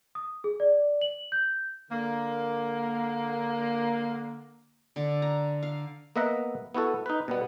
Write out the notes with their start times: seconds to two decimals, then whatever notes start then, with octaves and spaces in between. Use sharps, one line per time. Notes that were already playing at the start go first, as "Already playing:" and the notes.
0.15 D#6
0.44 G#4
0.60 D5
1.01 F#7
1.32 G6
1.90 D3 A#3
4.96 D3
5.22 A#5
5.63 F5
6.16 A#3 B3 D#5 E5 F#5 A#5
6.75 B3 E4 F#4 A4
7.06 D#4 B4
7.28 B2 G3 B3